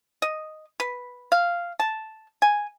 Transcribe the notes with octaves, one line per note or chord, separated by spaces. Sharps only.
D#5
B4
F5
A5
G#5